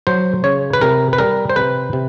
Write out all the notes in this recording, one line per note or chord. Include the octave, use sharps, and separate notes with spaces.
F#3 C5
C#3 C#5
B4
C3 A#4
B4
G3 A#4
C5
C3 B4
C3